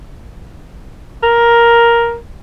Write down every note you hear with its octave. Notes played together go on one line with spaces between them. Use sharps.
A#4